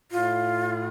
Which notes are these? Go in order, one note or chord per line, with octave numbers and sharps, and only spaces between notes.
A2 F4